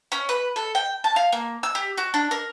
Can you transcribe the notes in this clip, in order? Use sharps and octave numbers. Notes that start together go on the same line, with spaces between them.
C#4
B4
A4
G5
A5
F5
A#3
E6
G4
F#4
D4
A#4